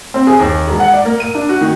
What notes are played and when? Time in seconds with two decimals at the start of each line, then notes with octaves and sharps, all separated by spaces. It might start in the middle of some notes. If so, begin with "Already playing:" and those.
0.14 C4
0.27 G#4
0.40 D#2
0.67 E1
0.80 F#5
0.94 D5
1.05 A#3
1.20 D#7
1.35 D4
1.49 F#4
1.61 D#3